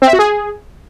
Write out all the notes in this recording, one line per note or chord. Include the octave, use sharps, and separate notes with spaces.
C4
E5
F#4
G#4